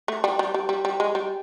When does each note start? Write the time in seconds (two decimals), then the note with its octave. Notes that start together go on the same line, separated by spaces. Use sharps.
0.08 A3
0.24 G3
0.39 G3
0.54 G3
0.69 G3
0.85 G3
1.00 G#3
1.15 G3